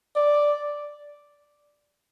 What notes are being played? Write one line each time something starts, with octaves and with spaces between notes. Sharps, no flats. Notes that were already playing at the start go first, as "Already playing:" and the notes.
D5